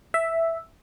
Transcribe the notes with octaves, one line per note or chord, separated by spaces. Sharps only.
E5